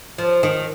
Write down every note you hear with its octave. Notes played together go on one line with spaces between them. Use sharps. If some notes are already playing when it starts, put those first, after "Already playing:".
F3
D#3